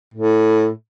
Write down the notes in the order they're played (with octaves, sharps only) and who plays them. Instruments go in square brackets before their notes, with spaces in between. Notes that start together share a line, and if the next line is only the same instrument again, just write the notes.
[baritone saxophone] A2